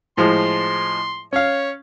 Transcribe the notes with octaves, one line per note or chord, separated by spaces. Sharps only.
A2 F3 G#3 C6
C#4 C#5 F5